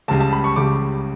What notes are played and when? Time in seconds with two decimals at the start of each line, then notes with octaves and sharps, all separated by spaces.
0.08 C#2 C#3 G3 A5
0.20 A5
0.33 B5
0.44 C#6
0.56 C#2 C#3 G3 D6